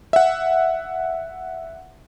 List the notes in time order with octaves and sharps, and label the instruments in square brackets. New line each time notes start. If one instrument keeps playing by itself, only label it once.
[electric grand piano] E5 F#5